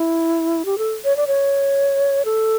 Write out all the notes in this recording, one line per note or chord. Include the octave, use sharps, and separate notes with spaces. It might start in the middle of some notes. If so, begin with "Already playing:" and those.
Already playing: E4
G4
A4
C#5
D5
C#5
A4